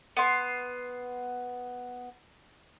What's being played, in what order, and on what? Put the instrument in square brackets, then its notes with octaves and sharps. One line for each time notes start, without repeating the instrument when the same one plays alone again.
[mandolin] B3 C6